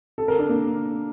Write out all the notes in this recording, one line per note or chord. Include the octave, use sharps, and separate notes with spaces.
A4
A#4
D4
A#3